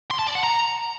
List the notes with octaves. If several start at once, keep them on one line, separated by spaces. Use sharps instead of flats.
C6
A5
D5
F#5
A#5